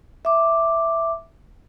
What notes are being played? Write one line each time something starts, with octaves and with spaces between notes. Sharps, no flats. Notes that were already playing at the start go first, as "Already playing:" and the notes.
E5 D6